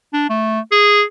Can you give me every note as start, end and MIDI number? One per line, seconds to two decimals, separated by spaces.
0.14 0.29 62
0.30 0.60 57
0.72 1.03 68